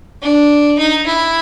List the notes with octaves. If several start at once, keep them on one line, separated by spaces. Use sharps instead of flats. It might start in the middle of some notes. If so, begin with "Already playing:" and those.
D4
D#4
E4